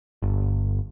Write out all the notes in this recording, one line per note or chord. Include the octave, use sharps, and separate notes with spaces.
G1